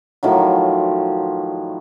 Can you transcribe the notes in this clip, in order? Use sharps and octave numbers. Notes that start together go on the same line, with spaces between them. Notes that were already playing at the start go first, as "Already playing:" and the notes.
A2 D#3 F3 F#3